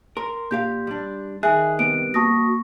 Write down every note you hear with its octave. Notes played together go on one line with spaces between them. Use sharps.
A#4 C6
A#2 G4 F5 G6
G3 D4
D#3 G#4 E5 G#5 F#6
C3 G3 B3 D7
A#3 F#4 A5 C#6 D#6 A#6